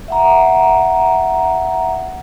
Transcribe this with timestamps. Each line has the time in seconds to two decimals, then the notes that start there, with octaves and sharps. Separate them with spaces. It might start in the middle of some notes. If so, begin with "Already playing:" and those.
0.08 E5 F#5 A#5